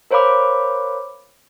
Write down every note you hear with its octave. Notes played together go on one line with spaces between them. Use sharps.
A#4 C5 C#5 F5 B5 D6